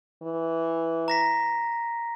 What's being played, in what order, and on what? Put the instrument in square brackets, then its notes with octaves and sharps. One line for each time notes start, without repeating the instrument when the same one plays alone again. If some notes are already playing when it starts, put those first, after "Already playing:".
[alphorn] E3
[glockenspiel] A#5 A#6 B6